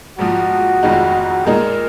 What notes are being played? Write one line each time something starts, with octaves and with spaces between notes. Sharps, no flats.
A#1 G#2 F3 F#4
F1 F2 D#3 G#3 D#4
A#2 G#3 D#4 A#4